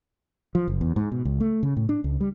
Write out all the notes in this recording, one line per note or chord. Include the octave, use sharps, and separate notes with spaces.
F3
F#1
E2
G#2
B2
C#2
A3
C#3
A2
D4
C#2
G3